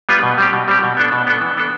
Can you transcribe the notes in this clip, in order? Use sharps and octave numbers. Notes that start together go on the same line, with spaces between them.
G3 B3 F4 B4
B2
G3 C4 G4
B2
G3 C4 G4
B2
B3 D4 A4
B2
B3 D4 A4
E3
B3 D4 A4